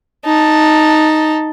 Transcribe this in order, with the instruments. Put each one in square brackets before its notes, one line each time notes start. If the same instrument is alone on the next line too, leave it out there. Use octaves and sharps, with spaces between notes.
[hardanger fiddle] D#4 A5